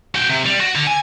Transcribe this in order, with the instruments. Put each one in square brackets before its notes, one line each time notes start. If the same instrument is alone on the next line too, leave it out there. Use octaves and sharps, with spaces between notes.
[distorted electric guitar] F#4 G5
C3
G3
F#4
D3
G#5